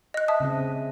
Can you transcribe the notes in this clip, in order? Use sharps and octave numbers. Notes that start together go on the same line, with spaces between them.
D#5 F#6
E5 A5 D#6
C#3 C4 D#5